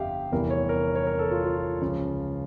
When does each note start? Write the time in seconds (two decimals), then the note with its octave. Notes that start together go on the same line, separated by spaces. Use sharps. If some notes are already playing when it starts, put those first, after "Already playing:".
Already playing: G1 F2 G4 E5 F5
0.31 F1 E2 E3 G3 A#4
0.50 C#5
0.69 A#4
0.95 C#5
1.07 A#4
1.19 A4
1.31 F4
1.44 F4
1.81 C#2 C#3 F3